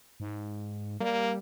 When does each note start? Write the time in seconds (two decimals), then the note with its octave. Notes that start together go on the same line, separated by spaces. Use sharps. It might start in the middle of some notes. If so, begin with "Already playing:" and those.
0.20 G#2
1.00 G3 A#3